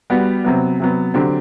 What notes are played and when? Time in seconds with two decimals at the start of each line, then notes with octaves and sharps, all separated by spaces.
0.10 G3 B3 F#4
0.44 C3 F#3 B3
0.80 C3 F#3 B3
1.14 D3 F#3 C4 G4